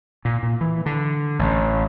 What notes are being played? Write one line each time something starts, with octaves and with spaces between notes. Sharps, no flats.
A#2
A#2
E3
D3
A1